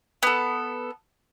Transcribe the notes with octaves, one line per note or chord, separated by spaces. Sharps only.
B3 A4